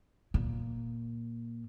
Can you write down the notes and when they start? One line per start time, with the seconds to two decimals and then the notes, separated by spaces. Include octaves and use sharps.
0.34 A#2